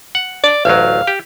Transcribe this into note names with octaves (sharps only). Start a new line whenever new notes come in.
F#5
D5
A1 D2 F#3 F5
G4